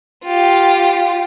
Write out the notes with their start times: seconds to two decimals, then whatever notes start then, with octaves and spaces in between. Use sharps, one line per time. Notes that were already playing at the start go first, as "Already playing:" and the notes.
0.24 F4 G4